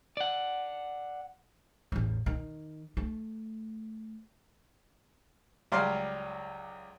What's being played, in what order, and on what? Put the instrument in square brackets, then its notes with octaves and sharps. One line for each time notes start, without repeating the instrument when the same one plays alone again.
[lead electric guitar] D5 F#5
[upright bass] A1 E2
D#3
A3
[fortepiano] C#2 F#3 G3 F5 G5 C6